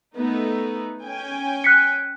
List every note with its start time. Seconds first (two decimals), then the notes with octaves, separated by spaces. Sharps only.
0.15 A3 B3 D#4
1.03 C#4 G5 G#5
1.64 F#6 B6 C#7